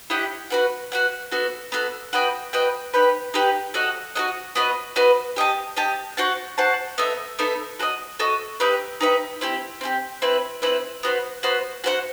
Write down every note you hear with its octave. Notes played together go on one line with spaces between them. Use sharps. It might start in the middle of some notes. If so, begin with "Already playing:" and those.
E4 G4 D#5 F#5
F#4 B4 F#5
F#4 B4 F#5
B3 F#4 A4
B3 F#4 A4
F#4 B4 D#5 G5
F#4 B4 D#5 G5
D#4 G4 B4
D#4 G4 B4
F#4 A4 D#5 F#5
F#4 A4 D#5 F#5
B3 F#4 B4 D#5
B3 F#4 B4 D#5
G4 D#5 A5
G4 D#5 A5
F#4 C5 F#5 A5
F#4 C5 F#5 A5
B3 D#4 A4 E5
B3 D#4 A4 E5
F#4 A4 D#5
F#4 A4 D#5
D#4 G4 B4 E5
D#4 G4 B4 E5
C4 E4 G4
C4 E4 G4
C4 E4 B4
C4 E4 B4
B3 F#4 C5
B3 F#4 C5
F#4 C5 F#5